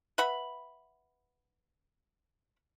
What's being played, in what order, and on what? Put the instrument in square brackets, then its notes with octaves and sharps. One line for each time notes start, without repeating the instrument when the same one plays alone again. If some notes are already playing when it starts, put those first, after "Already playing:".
[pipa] B4 E5 F#5 B5